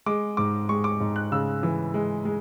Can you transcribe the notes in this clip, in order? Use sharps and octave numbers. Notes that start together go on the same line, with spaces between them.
G#3 D6
G#2 D6
G#3 C#6
D6
G#2
F#6
C#3 E6
E3
G#3
G#3